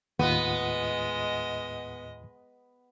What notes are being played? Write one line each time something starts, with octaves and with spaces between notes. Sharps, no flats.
D#2 A2 G#3 B3 F4 D#5